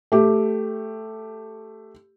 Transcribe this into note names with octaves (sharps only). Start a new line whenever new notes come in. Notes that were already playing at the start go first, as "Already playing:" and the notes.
A3 G4